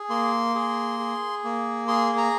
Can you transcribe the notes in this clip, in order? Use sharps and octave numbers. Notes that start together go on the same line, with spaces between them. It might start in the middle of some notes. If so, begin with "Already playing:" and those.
Already playing: G#4
A#3 C6
G#4
G#4
A#3
G#4 C6
A#5